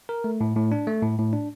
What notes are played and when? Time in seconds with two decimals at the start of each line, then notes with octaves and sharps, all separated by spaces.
0.09 A#4
0.24 A3
0.41 A2
0.56 A2
0.72 D4
0.87 A3
1.02 A2
1.18 A2
1.33 D4